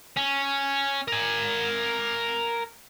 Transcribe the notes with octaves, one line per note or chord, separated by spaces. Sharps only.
C#4
A#4 G#5